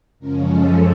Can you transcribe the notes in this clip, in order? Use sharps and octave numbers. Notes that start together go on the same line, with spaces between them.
F#2 C#3 F3 G#3 C#4 A#4
A4